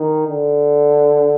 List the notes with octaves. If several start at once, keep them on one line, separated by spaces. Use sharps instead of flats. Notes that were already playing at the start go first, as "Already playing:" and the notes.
Already playing: D#3
D3